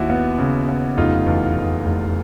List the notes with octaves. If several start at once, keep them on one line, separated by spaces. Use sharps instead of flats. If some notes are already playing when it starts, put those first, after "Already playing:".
Already playing: D#2 E4 F#4
B3
C#3
B3
F1 D#4 F4
E2
E2
F1